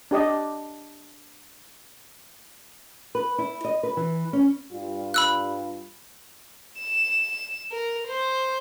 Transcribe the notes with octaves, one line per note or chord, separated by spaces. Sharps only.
D4 G4 D5 D#5
B4
E4
D#5
B4
E3
C#4
G2 G3 F4
B5 E6 F#6
E7
A#4
C5